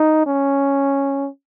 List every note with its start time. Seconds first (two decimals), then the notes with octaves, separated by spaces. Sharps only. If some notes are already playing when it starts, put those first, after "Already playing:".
Already playing: D#4
0.26 C#4